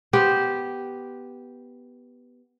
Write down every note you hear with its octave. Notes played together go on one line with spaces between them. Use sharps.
B3 G4 C5